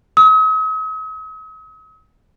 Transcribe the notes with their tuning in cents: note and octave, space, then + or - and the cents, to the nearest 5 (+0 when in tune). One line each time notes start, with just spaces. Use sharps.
D#6 +45